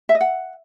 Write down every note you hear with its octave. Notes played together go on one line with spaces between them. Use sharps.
E5
D#5
F#5